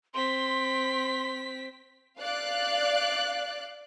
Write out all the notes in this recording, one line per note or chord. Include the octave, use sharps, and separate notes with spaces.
C4 C6 B6
D5 F5 F#6